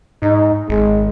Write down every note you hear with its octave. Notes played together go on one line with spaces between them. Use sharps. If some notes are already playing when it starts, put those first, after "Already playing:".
G#2 D#4
G#1 G#3